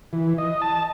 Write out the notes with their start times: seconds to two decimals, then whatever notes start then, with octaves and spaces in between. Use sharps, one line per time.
0.13 E3
0.38 D#5
0.62 A5